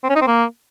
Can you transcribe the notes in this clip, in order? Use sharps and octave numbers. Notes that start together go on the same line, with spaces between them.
C4
C#4
D#4
C4
A#3